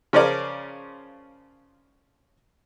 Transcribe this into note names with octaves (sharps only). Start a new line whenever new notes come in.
C#3 F3 C#4 F4 A#4 D5